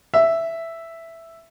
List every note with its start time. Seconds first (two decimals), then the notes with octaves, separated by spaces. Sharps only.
0.14 E5